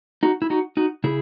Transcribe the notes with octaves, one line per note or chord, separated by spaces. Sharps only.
D#4 F#4
E4
D#4 F#4
D#4 F#4
C#3 E4 G#4